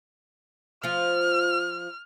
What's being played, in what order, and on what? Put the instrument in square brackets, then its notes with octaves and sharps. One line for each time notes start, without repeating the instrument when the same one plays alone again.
[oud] F3 F4 [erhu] F6